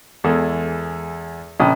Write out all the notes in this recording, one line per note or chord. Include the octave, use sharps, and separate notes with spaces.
E2 E3 G#3 G#4 A4 E5
A#1 C#3 G5 D#6